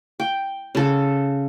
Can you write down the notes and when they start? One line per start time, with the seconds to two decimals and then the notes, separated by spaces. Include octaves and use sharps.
0.20 G5
0.75 C#3 A4